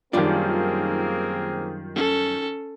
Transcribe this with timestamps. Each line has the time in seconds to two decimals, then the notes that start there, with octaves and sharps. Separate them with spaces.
0.13 F#2 D#3 G3 A#3 C4 D4 F4 G#4
1.96 C#4 A4